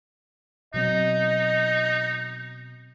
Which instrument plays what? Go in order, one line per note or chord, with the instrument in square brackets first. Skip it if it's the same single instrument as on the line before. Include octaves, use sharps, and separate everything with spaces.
[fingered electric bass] B2 F#3 C4 [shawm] D#4 [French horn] D#5